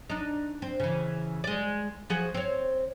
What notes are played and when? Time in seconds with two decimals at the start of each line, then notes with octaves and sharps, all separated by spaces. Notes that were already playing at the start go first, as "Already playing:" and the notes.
0.10 D4 D#4
0.62 C4
0.80 C#3 E3
1.44 G#3 D5
2.10 F3 F#4 G#4
2.34 C4 C#5